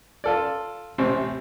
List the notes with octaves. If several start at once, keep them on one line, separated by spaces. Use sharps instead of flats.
F4 A4 D5
A1 C3 C4